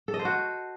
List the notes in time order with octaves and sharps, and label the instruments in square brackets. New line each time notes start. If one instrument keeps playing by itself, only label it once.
[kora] A4
D#5
C5
F#4